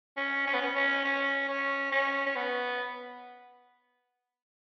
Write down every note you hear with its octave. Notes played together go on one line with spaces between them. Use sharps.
C#4
C#4
B3
C#4
C#4
C#4
C#4
C#4
C#4
B3